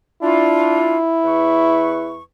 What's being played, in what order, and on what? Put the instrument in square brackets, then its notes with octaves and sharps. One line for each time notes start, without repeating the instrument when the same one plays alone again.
[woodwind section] D4 F4 [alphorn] E4
[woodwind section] E2 B4 C#6